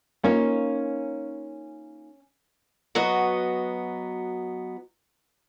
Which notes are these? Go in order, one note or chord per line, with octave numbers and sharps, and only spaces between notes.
A#3 C#4 D#4 F4
F#3 B3 F#4 D#5